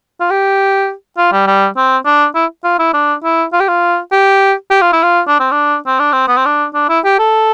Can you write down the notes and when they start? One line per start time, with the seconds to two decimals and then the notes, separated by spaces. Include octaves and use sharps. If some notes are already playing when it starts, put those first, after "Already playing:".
0.20 F4
0.31 G4
1.18 F4
1.32 G3
1.47 G3
1.77 C4
2.06 D4
2.35 E4
2.64 F4
2.79 E4
2.94 D4
3.24 E4
3.53 F4
3.60 G4
3.68 F4
4.12 G4
4.70 G4
4.81 F4
4.93 E4
5.03 F4
5.28 D4
5.40 C4
5.52 D4
5.87 C4
6.00 D4
6.13 C4
6.28 B3
6.37 C4
6.45 D4
6.74 D4
6.89 E4
7.05 G4
7.19 A4